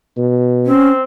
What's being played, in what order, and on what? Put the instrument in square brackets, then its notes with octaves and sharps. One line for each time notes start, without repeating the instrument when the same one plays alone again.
[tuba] B2
[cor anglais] C4 [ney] C#4